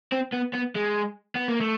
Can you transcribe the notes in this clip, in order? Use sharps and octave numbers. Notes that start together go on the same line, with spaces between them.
C4
B3
B3
G#3
B3
A#3
A3